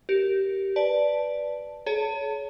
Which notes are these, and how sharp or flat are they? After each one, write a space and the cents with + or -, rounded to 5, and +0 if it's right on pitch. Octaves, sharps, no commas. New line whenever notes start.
G4 -15 A#4 +0
B4 +0 D5 +0 A5 +0
G#4 +40 C#5 +20 A5 +35